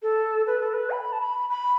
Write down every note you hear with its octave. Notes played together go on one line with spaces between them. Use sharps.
A4
B4
A4
B4
B5
A5
B5
B5